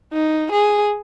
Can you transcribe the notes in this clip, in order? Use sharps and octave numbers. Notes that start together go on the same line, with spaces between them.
D#4
G#4